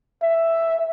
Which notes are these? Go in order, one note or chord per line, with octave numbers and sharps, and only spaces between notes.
E5